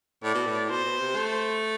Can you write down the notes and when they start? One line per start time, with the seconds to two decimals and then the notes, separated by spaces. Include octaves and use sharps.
0.23 A2 D5
0.35 B2
0.46 A2
0.70 B2 C5
0.85 B2
1.00 C3
1.16 A3